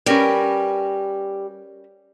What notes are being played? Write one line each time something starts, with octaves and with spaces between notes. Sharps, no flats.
G3 C#4 A#4 B4